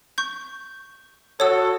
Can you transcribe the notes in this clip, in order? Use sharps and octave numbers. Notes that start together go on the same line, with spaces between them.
C#6 G6
F#4 A4 C#5 D#6 E6